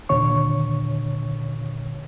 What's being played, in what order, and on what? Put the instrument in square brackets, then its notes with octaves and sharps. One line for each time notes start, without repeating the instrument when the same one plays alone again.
[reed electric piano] D#2 A#2 D3 C#5 C#6